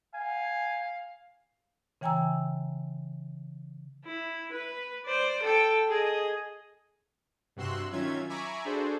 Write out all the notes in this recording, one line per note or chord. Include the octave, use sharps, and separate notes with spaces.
F5 G#5
C#3 E3 G5 G#5 A#5 E6
E4
B4
C5 D5
A4 G5
G#4 D#5
G2 C3 F#4 C6 E6 F#6
D#3 F#3 C#4 F4 E5 G#6
E5 G#5 A#5 B5 C#6 D6
D4 F#4 G#4 A4 C5 D5